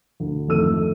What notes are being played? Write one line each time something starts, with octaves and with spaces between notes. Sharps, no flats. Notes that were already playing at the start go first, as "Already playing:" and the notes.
D2
G#1 F2 A3 E6 D#7